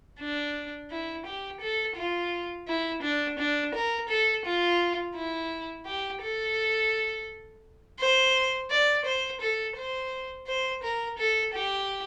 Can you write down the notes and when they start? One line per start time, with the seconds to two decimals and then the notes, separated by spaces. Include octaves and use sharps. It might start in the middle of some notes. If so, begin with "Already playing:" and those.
0.19 D4
0.90 E4
1.26 G4
1.60 A4
1.96 F4
2.67 E4
3.03 D4
3.39 D4
3.74 A#4
4.09 A4
4.45 F4
5.15 E4
5.86 G4
6.22 A4
7.99 C5
8.70 D5
9.05 C5
9.41 A4
9.76 C5
10.47 C5
10.83 A#4
11.18 A4
11.54 G4